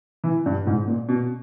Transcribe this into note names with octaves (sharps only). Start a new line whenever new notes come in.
E3
G2
G#2
A#2
B2